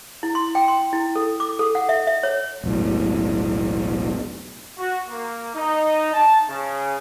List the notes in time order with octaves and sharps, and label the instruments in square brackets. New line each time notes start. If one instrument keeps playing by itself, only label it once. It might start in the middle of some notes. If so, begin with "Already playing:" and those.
[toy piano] E4
C6
G5
C6
E4
A4
D6
A4
F#5
E5
E5
C#5
[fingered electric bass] E1 B1 A2
[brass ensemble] F#4
A#3
D#4
A5
C#3